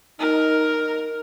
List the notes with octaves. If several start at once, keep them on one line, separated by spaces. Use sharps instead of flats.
D#4 A#4